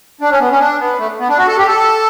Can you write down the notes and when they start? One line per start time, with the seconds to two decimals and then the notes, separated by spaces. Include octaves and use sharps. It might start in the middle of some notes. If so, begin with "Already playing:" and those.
0.21 D4
0.30 C#4
0.40 B3
0.50 C#4
0.60 D4
0.79 B3
0.99 A3
1.19 B3
1.29 D4
1.38 F#4
1.48 A4
1.58 G4
1.67 A4